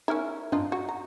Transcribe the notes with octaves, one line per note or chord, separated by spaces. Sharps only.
C#4 D#4 E4 A#4
G2 D4 D#4 F4
F#4
A#5